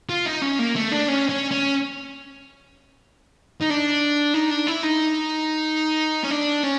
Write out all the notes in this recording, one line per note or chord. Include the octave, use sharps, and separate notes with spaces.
F4
D#4
C#4
A#3
A3
D4
C#4
C#4
C#4
D#4
D4
D#4
D4
E4
D#4
C#4
D4
C#4